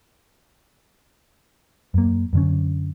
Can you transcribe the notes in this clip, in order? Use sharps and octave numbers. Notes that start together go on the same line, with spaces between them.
F#2 A#3
F#2 D3 C#4